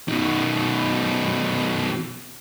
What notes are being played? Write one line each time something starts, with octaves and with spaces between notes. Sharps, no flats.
B2 D#3